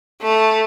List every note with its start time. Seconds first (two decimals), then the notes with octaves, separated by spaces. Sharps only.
0.22 A3